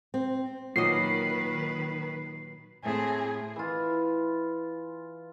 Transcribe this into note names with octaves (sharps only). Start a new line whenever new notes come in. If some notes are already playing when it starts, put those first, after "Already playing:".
C4
A#2 D#3 F#3 B4 D#5 C7
A2 A3 C4 G#4
E3 F4